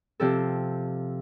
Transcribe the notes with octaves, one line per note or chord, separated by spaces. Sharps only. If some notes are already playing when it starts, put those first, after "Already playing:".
C3 F3 A4